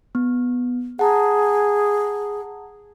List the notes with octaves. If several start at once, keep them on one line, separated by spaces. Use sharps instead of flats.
B3
G#4 F#5 A5 A#5